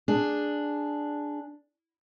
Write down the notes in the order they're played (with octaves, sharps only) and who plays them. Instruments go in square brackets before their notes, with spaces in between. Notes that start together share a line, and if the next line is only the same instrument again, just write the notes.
[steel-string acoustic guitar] D4 G#4